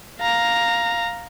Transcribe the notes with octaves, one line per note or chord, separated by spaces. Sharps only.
F5 A#5